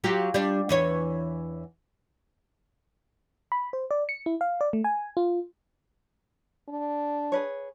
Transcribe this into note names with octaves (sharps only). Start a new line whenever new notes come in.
F#3 F4 G4
G3 D4
E2 E3 C#5
B5
C5
D5
C#7
E4
F5
D5
A3
G#5
F4
D4
G#4 B4 C#5